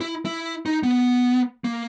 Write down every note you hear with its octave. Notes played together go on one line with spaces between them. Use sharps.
E4
E4
D#4
B3
A#3